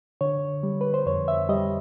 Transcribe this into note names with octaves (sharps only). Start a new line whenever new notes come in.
D3 C#5
G3
B4
C5
F2 C#5
E5
G3 D#5